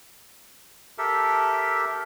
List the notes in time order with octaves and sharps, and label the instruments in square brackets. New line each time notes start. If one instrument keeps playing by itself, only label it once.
[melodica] G4 A4 A#4 E5